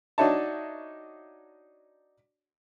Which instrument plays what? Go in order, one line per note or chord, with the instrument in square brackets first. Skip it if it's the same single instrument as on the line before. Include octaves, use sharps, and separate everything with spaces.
[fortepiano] D4 D#4 F#4 C#5 E5 A5